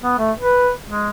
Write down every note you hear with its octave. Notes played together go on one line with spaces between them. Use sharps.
B3
A3
B4
G#3